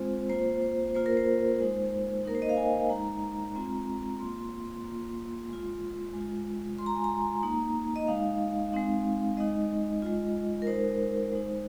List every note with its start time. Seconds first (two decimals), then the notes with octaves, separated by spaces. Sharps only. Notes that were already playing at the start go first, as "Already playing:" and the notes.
Already playing: G#3 C4 F4 C5
0.29 A#3 F4 C5
0.62 C5
0.95 A#3 F4 C5
1.06 A#4
1.17 C5
1.60 G#3 D#4
2.25 A#3 D#4 A#4
2.35 C5
2.42 D#5
2.49 F5
2.57 G#5
2.89 G#3 D#4 A#5
3.55 G#3 C4 F4
4.19 A#3 F4 C6
4.84 A#3 F4
5.49 G#3 F4
6.13 G#3 F4
6.79 G#3 F4 C6
6.86 A#5
6.95 G#5
7.04 A#5
7.43 A#3 D#4
7.96 D#5
8.07 G#3 D#4 F5
8.73 G#3 C4 D#4
9.37 G#3 D#4 D#5
10.02 G#3 F4
10.62 A#4
10.67 G#3 D#4 C5
11.32 G#3 D#4